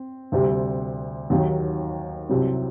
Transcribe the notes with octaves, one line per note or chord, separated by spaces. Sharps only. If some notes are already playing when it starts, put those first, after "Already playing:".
Already playing: C4
D2 C3 G3
D#2 D#3 F#3
C2 C3 F#3